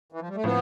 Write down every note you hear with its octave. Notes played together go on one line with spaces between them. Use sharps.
E3
F3
G3
A3
A2 F3 B3 C4